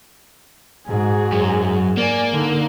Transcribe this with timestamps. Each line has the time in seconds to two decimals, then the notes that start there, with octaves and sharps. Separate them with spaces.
0.88 G#2 F#4 G#4
1.32 F#2
1.97 A#3 D5 G#5
2.33 D3 D#4